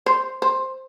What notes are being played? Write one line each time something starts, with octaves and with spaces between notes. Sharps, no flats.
C5
C5